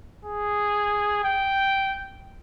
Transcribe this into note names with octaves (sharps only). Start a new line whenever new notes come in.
G#4
G5